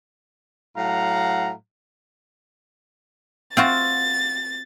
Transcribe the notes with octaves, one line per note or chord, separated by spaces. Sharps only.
A2 F#3 F5 F#5 A#5
C4 F4 F#4 A6